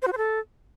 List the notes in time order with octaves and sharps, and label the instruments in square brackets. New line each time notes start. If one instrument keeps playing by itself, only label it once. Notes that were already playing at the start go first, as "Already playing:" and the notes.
[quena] C5
F#4
C5
A4